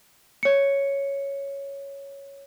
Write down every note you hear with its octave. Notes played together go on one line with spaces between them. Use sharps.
C#5 C#7